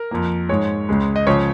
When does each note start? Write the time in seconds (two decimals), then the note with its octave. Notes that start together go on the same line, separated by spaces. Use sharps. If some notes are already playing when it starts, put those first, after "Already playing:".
Already playing: A#4
0.11 F2 F3 A#3
0.49 G#2 G#3 C#5
0.89 C#2 C#3 G#3
1.16 D#5
1.27 C#2 C#3 F3 C#5